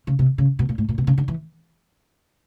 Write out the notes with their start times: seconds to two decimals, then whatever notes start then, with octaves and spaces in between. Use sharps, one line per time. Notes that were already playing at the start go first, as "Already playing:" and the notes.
0.07 C#3
0.19 C3
0.38 C#3
0.59 B2
0.69 A#2
0.78 A2
0.89 A#2
0.98 B2
1.07 C#3
1.18 D3
1.28 E3